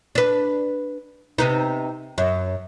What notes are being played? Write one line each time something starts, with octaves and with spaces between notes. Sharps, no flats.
D4 B4
C3 B3 D#4
F#2